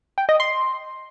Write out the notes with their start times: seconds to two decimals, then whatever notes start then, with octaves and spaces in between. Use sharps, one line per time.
0.18 G5
0.29 D#5
0.40 C6